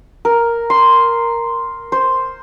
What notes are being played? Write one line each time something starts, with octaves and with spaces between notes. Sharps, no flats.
A#4
C6
C5